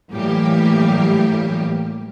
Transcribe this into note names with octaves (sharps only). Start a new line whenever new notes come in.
A2 E3 F#3 G3 A#3 G4